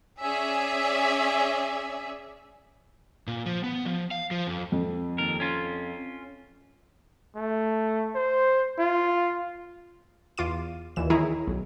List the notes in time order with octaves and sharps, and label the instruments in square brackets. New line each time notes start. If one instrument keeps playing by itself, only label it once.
[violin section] C#4 G#4 D5 E5 G#5
[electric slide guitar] A#2
F3
B3
F3
F5
F3
F2
[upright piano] F2
[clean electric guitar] D#2 A#4
C#4 F4
[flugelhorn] A3
C5
F4
[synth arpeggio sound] E2 F4 D6 D#7
D#2 A#2 E3 E7
D#3 E4 G#4 C#5 A#5
B1